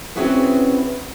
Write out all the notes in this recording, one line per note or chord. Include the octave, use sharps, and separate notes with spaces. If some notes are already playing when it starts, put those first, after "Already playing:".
C4 C#4 E4 F#4 G#4 B4